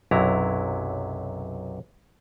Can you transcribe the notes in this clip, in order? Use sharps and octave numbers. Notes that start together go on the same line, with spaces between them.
B1 F#2 C3 F#3 E4 A#5